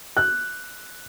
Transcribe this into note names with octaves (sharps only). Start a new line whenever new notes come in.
F#6